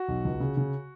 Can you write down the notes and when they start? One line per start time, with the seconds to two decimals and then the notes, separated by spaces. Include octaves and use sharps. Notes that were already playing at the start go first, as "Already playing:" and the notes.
Already playing: F#4
0.08 B1
0.25 C#2
0.40 C#3
0.57 C#3